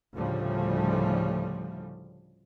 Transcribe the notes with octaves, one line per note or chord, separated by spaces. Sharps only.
D2 A2 C#3 F3 G3